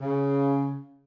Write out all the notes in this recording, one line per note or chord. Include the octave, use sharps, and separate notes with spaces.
C#3